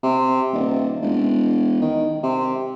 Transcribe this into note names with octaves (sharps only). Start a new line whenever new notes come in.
C3
D#1
E1
D#3
C3